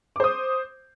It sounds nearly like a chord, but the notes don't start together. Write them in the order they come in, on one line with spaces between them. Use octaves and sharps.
D6 C5 D#6